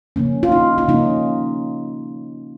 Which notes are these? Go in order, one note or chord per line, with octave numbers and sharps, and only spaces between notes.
C#3 F3 A#3 C#4
F4
D#4
F4
C#3 F3 A#3 C#4 D#4